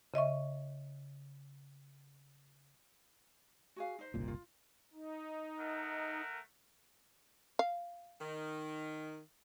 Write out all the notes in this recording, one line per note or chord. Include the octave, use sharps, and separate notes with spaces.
C#3 D#5 E5 C#6
F#4 G#4 F5
D#4 C5
F#1 C2 A#2
F4
D#4
A3 A#4 F#5
F5
D#3